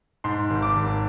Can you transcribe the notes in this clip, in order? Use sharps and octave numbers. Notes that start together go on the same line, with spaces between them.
G#2 C6
G#1
D6
G#1